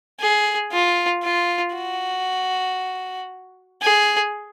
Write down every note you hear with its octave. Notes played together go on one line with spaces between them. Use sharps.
G#4
F4
F4
F#4
G#4